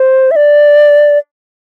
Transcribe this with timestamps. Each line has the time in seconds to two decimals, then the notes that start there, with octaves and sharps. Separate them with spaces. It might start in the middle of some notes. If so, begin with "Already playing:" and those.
Already playing: C5
0.31 E5
0.36 D5